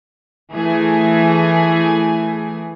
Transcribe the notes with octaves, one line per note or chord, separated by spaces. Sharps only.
E3 A3 G#4